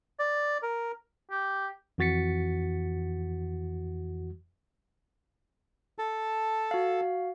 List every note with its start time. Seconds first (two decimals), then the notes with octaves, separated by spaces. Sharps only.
0.19 D5
0.62 A#4
1.31 G4
1.98 F2 E3 F#4 A6 B6 C#7
5.98 A4 A5
6.71 F#4 F5